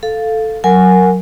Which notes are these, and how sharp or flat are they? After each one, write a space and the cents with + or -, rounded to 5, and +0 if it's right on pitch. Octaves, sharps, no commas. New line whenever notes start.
A4 +0 F5 +0
F#3 -5 A#4 -5 G#5 +0